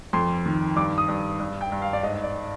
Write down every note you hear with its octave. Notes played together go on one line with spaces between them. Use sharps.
F2 C6
D#3
G2 D6
D#6
G2
G2
G5
G2
F5
D5
G#2 D#5
D5